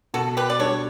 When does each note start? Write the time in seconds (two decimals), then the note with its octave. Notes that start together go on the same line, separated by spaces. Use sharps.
0.14 B2 F#4 A4
0.37 G4 B4
0.50 D5
0.59 G3 D4 G4 A4 C#5